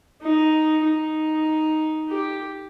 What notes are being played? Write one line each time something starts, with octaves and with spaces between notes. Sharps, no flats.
D#4
D#4
G4